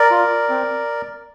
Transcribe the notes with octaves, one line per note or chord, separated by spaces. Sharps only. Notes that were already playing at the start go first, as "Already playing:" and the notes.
Already playing: A#4 D5
F4
C4